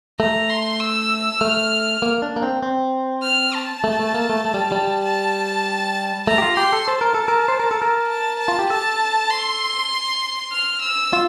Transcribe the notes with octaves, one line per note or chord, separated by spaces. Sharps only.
A3 A#5
C6
E6
A3 F6
A#3
D4
A#3
C4
C4
F6
A5
A3
A3
A#3
A3
A3
G3
G3
A5
A3 A#5
G4
F4
G4 C6
A4
C5 A5
A#4
A4
A#4
C5
A#4
A4
A#4
A5
A5
F4
G4
A4 A5
C6
F6
E6
F4